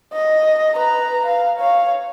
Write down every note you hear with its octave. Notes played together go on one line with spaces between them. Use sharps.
D#5
B4 A#5
F5
C#5 F5